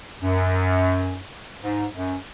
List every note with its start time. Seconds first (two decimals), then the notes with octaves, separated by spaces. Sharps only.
0.22 F#2
1.63 G#2
1.94 F#2